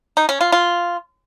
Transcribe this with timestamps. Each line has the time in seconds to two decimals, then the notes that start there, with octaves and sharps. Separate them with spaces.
0.17 D#4
0.29 C#4
0.41 F4
0.52 F4